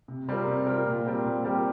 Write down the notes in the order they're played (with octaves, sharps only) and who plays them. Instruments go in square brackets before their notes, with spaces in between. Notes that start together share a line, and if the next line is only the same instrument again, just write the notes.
[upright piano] C3
G3 C4 F4 A#4
C3
G3 C4 F4 A#4
A#2
G3 C4 G4 A#4
A#2
G3 C4 G4 A#4